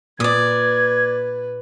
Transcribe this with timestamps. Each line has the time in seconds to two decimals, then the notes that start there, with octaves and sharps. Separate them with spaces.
0.20 A#2 B4 D5 D#6 G#6